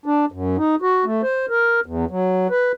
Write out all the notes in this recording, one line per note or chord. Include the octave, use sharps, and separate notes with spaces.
D4
F#2
D#4
F#4
A3
C5
A#4
E2
F#3
B4